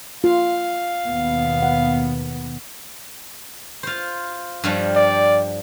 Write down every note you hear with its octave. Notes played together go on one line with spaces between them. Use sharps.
F4 F5
D#2 B2 B3
F#5
F4 C5
G2 F3 G3
D5